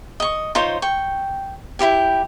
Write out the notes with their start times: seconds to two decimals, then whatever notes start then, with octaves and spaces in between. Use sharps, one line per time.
0.20 D#5 C#6
0.55 D#4 F4 C5 C#5
0.82 G5 C#6
1.79 E4 F4 G4 G5